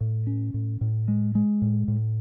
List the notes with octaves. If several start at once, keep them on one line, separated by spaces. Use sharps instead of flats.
A2
C#4
A2
A2
G#3
G#3
A2
A2